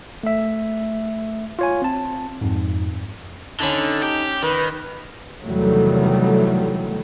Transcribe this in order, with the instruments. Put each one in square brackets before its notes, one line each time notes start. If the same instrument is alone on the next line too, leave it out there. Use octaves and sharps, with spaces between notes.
[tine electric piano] A3 E5
F4 C#5 G#5
C4 A5
F2 G#2
[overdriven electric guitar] D3 [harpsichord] C#4 B5 C6 [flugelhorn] D#4
[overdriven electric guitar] G4
[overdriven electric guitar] D#3 [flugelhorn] B4
[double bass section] E2 C3 D#3 F#3 G3 A3